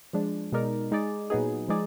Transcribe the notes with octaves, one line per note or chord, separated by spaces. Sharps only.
F3 G#3 D4
B2 G#3 D#4 A#4 D5
G#3 D#4 G#4 D5
A#2 F#3 B3 D#4 G#4
F3 G#3 D#4 G#4 D5